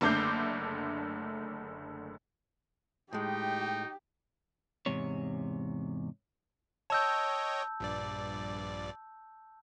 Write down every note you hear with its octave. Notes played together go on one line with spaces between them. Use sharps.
F#1 D3 A3 D6 G6 C7
A2 G#3 D#4 G4 G5
E2 G#2 C3 C#5
C#5 D#5 G5 A5 E6 G6
A#1 G2 D5